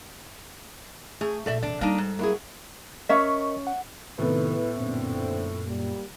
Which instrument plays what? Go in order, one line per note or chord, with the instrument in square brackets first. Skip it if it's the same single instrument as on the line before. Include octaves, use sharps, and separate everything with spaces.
[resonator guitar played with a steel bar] A3 [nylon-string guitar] G#4
[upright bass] A#1 [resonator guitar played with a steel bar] A3 D5 E5 [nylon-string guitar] A4
[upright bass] C3 E3 [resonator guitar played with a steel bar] D4 D5
[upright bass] G3 [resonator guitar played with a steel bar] A#3 D4 D#4
[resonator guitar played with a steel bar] G#2
[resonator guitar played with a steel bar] F#3 [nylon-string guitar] A#3 E4 G#4
[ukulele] C#4 E5 [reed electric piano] A#4 D#5 C#6
[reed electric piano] F#5
[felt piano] A2 B3 A4 [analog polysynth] C3 D#3 [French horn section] E4 B4
[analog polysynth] F#2 A#2 [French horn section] D3 C4
[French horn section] G3 A#3